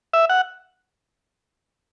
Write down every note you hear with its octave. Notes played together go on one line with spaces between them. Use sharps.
E5
F#5